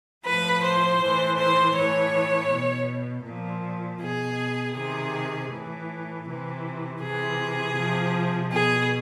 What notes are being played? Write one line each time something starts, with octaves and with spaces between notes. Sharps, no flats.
A2 F3 B4
C5
A2 E3
C5
A2 E3 C#5
B2
A#2 F3
B2 G#4
C3 D#3 G#4
A2 E3
C3 E3
C3 E3 G#4
C3 F3
B2 G#4